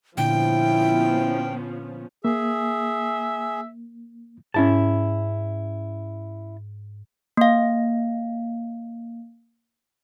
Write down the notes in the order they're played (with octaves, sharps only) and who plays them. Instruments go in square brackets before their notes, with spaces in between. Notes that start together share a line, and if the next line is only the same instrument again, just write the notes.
[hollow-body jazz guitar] A#2 D3 [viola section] F3 B3 C#4 [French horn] E4 [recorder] G5
[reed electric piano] A#3 [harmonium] G#4 [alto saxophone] E5
[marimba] G#2 [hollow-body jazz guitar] C#4 E4 A5
[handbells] A#3 F5